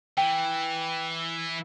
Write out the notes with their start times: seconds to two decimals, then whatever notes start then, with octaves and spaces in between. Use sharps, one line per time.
0.18 E3 G5